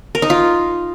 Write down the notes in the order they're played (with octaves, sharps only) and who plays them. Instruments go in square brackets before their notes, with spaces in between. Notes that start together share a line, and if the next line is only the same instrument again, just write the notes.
[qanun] A#4
D#4
F4